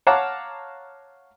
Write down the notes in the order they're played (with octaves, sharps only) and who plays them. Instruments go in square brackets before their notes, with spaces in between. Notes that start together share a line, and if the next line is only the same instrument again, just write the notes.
[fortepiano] C#5 F5 F#5 A5 A#5 D6